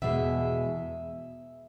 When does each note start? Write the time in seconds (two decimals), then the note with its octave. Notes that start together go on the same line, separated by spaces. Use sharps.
0.02 E2 B2 G#3 E5